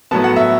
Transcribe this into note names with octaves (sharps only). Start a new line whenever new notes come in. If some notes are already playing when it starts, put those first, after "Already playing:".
A2 F#3 B3 A5
F#5
E5